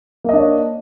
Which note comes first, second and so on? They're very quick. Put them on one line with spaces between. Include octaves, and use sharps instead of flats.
A#3 D#5 D4 C#5